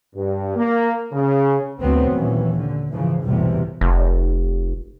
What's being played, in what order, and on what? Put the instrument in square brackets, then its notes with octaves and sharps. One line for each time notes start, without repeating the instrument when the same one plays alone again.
[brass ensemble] G2
A#3
C#3
[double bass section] D2 F#3 B3 C4
D#2 A#2 E3 C#4
D3
G#2 C#3 E3 F3
B1 E2 A2 C3 E3 G3
[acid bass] F1